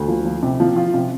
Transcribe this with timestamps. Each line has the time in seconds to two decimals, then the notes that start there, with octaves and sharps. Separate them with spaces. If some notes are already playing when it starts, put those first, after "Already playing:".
Already playing: D2
0.08 F3
0.25 F3
0.43 C3
0.60 F3
0.76 F4
0.94 C3